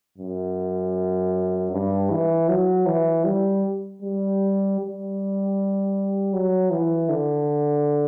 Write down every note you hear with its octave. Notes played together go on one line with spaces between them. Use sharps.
F#2
G2
E3
F#3
E3
G3
G3
G3
F#3
E3
D3